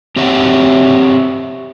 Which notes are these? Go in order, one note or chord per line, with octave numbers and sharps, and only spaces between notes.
C4 G4 C#5 E5 F#5